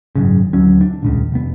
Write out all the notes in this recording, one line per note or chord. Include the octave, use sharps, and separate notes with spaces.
G#1 F#2 C#3
D2 F#3 C#4
D4
D#1 C#2 C#3
F1 B3